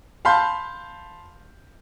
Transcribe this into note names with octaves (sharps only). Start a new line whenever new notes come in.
F5 A5 B5 C6 G6